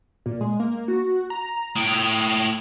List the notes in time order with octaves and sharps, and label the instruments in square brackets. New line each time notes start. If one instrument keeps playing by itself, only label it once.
[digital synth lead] A#2
G#3
A#3
F#4
A#5
[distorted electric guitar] A2 G5 [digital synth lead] D#6